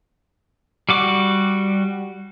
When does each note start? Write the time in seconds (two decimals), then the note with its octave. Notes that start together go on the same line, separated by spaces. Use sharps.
0.89 G3 F#4 D6